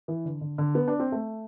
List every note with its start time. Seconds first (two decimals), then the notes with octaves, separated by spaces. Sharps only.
0.08 E3
0.25 D3
0.41 D3
0.58 D3
0.75 B3
0.88 D4
1.00 C4
1.12 A3